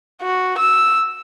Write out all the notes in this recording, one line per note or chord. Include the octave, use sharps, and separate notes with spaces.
F#4
E6